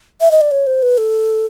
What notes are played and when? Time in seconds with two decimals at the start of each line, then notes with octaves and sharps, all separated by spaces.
0.21 E5
0.31 D#5
0.41 D5
0.51 C#5
0.67 C5
0.82 B4
0.98 A4